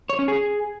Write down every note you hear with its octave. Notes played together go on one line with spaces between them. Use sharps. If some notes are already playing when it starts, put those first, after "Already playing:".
C#5
C#4
G#4